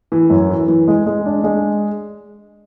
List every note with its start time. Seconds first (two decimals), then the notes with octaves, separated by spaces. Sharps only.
0.12 E3
0.30 F#2
0.50 E3
0.68 E3
0.88 G#3
1.06 G#3
1.26 D4
1.44 G#3